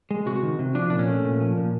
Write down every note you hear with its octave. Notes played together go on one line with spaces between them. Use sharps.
G#3
C3 F#4
D#3
C3
F3 D4
A#2 D4
C#4
A3
A#2
F3
A#2